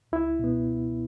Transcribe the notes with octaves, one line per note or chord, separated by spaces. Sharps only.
C#2 E4
B2 B3